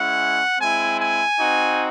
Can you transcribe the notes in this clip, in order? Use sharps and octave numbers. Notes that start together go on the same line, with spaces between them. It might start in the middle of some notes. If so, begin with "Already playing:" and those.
Already playing: G#3 C#4 E4 F#5
G#3 C4 E4 G#5
G#5
C4 D#4 F#4